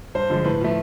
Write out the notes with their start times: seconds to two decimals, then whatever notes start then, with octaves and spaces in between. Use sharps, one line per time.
0.15 G2 C5
0.30 D3 F3 G#3
0.45 A2 B4
0.61 F3 A3